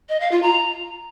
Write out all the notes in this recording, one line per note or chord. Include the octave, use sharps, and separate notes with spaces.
D#5
F5
F4
A#5